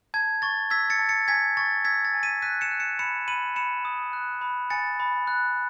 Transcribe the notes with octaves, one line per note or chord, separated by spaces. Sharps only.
A5 G#6
C#6 A6
E6 G#6 B6
A6 C#7
A5
A6 C#7
G#5 G#6 B6
C#6 A6
E6 G#6 B6
A6
G#5
B6 D#7
F#6 B6 D#7
C#7 E7
F#6
C#7 E7
B5 C#7 E7
B5 D#7 F#7
B5 C#7 E7
D#6
F#6
B5
G#5 A6 C#7
B5
F#6